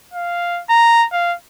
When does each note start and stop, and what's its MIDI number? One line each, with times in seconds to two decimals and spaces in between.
0.14 0.61 77
0.70 1.06 82
1.12 1.35 77